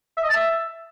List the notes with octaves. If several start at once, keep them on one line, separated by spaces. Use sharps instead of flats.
E5
D#5
A5
E5